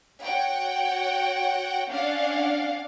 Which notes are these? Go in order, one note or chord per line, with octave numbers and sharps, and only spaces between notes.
F#4 C#5 F#5 G5
C#4 D4 D5 F5 F#5